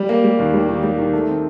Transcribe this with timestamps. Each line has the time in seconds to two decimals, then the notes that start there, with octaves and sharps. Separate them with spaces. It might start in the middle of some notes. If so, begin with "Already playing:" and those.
Already playing: G3
0.09 A#3
0.24 G3
0.39 D#2
0.54 G3
0.69 D#3
0.83 G3
0.98 D#3
1.13 A3
1.28 C4